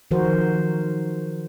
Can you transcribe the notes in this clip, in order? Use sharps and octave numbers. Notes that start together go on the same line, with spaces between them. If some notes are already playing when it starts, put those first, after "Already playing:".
D#3 F3 F#4 A#4 C5